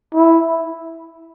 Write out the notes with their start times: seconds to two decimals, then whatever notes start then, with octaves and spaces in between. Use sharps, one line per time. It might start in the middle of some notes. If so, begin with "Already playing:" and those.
0.15 E4